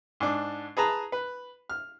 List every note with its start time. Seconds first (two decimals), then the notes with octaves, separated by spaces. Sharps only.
0.20 G#2 D4 D6
0.77 G#4 B4 A5 A#5
1.12 B4
1.69 F6